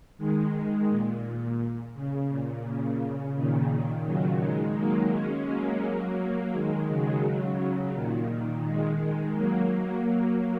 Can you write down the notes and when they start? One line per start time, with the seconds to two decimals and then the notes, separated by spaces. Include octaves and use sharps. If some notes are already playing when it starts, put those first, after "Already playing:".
0.18 D#3 G#3
0.89 A#2
1.94 C#3
2.29 A#2
2.65 C#3
3.35 A#2 D#3
4.06 C#3 F#3
4.41 D#3 G#3
4.76 F#3 A#3
5.12 G#3 C#4
5.47 F#3 A#3
6.53 D#3 G#3
6.88 C#3 F#3
7.94 A#2 D#3
8.64 D#3 G#3
9.34 F#3 A#3
9.70 F#3 A#3
10.05 F#3 A#3